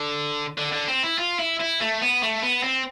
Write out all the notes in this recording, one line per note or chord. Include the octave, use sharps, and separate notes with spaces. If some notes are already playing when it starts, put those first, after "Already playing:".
Already playing: D3
D3
D3
C4
E4
F4
E4
E4
A3
B3
A3
B3
C4